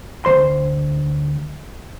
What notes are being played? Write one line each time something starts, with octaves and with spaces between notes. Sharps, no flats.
D2 E3 C5 C6